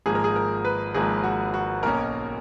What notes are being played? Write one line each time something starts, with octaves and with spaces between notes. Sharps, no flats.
G#1 G#2 F3 A#3 G#4
A#4
G#4
A#4
B4
G#1 G#2 F3 A#3 G#4
F#4
F#4
B1 B2 A#3 C#4 A#4